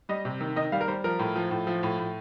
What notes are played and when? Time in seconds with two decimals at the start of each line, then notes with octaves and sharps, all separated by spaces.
0.09 G3 D#5
0.25 C3
0.41 D#3
0.56 D#3 D#5
0.72 G3 F5
0.81 A#4
0.88 G3 C5
1.04 F3 A#4
1.19 A2
1.36 F3
1.51 A2
1.67 F3
1.83 A2
1.99 A2